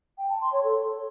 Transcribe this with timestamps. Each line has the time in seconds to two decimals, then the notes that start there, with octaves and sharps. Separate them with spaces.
0.18 G5
0.29 A5
0.41 C6
0.52 C#5
0.64 A4